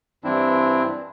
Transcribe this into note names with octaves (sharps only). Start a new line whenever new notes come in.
G2 E3 C4 D4 E4